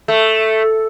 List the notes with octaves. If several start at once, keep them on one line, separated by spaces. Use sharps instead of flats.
A3